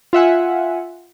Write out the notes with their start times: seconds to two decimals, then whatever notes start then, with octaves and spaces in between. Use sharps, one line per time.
0.13 F4 E5 F#5 G#5